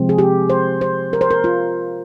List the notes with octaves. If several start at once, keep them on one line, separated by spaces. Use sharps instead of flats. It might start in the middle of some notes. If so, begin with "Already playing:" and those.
Already playing: C3 F3 G#3 C4
G#4
G4
C5
C5
A#4
C5
A#4
F4